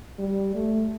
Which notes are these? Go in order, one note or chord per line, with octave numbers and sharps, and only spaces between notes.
G3
A3